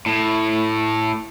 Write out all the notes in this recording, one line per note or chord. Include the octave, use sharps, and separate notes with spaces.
A2